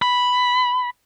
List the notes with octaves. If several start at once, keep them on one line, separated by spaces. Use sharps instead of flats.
B5